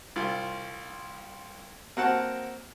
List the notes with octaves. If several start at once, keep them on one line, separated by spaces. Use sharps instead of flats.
C2 F4
A#3 C4 F#4 F#5 A5